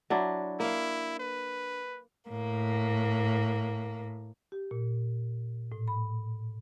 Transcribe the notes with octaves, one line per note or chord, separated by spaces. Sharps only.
F#3 D4 E4
A#3 E4 F5
B4
A2 A#3
G4
A#2
A2
B5